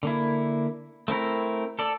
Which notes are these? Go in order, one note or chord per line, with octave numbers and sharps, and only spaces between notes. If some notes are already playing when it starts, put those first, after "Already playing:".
D3 A#3 E4
A3 C4 E4 A#4
A4 D5